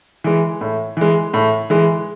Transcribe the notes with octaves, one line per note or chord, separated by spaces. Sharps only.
E3 G#3
A2
E3 G#3
A2
E3 G#3